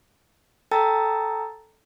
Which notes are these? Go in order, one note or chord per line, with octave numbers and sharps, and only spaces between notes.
A4 G5 A5 A#5 E6 A6